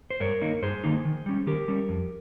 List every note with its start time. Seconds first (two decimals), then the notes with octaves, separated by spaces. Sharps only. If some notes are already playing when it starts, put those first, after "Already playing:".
0.10 C5
0.20 G2 A#4 C#5
0.41 D#3 A#3 D#4
0.62 G2 G#4 C5
0.84 D#3 A#3 D#4
1.05 D#3
1.26 G3 C#4
1.47 D#3 G4 A#4
1.68 G3 C#4
1.89 F2